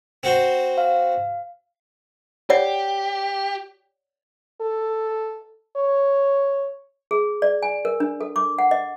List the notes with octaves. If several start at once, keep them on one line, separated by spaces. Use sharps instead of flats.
C4 F#4 C5
F5
G4 C#5 D5 F#5
A4
C#5
G#4
D5
G#5
A#4
D4
A4
D6
F#5
D#5